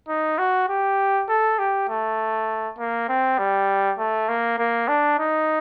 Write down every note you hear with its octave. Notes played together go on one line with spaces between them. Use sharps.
D#4
F#4
G4
A4
G4
A3
A#3
C4
G3
A3
A#3
A#3
D4
D#4